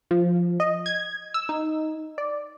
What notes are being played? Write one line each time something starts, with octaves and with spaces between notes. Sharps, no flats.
F3
D#5
G#6
E6
D#4
D5